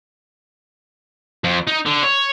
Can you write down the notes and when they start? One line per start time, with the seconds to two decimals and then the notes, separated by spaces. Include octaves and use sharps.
1.44 F2
1.67 D#4
1.86 D3
2.03 C#5